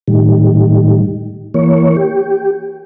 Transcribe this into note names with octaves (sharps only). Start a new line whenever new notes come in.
A2 D#3 G3
E3 A#3 C#5
G4